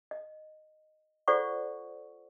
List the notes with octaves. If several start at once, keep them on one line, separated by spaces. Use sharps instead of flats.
D#5
F4 A4 C5 D5 F#5 C#6